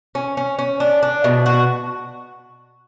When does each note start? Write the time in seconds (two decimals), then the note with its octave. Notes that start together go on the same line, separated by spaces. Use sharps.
0.15 C#4
0.37 C#4
0.59 C#4
0.80 D4
1.03 D4
1.24 B2
1.46 F#4